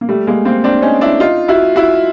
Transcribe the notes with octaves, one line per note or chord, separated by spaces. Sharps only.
A#3
G3 A3
G#3 A#3
A#3 C4
C4 D4
C#4 D#4
D4 E4
D#4 F4
E4 F#4
E4 F#4